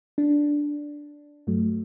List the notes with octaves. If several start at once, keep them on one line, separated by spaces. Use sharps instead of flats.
D4
G2 F#3 A3